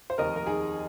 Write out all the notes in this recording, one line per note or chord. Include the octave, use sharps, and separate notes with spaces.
C5
F1 D#2 D#3 A#4 D#5
A#4
D#4 G#4